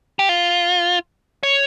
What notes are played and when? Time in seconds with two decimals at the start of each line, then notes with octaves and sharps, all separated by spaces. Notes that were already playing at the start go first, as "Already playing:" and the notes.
0.19 G4
0.29 F4
1.43 C#5